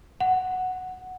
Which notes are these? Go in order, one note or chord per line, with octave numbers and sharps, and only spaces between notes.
F#5